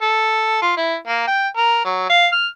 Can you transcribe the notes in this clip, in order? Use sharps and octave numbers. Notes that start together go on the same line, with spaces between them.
A4
F4
E4
A#3
G5
A#4
F#3
F5
F6